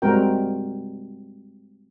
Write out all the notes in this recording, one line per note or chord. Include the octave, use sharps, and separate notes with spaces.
G3 G#3 C4 F#4 A#4 G5